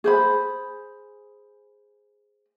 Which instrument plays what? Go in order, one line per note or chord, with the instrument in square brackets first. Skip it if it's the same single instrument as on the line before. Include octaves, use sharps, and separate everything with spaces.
[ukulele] G#4 C5 B5